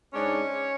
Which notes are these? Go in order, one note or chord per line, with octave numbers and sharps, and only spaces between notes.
G#2 G#3 C#4 D4 C#5